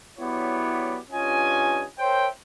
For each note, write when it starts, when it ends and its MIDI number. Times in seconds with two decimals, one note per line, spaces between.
0.19 0.97 54
0.19 0.97 59
0.19 0.97 64
0.19 0.97 67
0.19 0.97 73
0.19 0.97 74
1.11 1.83 43
1.11 1.83 61
1.11 1.83 65
1.11 1.83 75
1.11 1.83 80
1.99 2.27 70
1.99 2.27 72
1.99 2.27 73
1.99 2.27 76
1.99 2.27 79